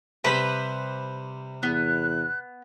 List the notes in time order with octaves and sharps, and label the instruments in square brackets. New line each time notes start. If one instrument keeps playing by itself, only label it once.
[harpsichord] C3 G3 [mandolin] B4 C5 B5
[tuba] E2 [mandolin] B3 [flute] F#6